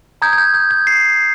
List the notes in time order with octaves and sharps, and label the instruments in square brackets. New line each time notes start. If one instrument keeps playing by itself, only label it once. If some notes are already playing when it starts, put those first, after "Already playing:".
[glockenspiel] A#5 D#6 G6 G#6
G#6
G6
G6
G#6
C7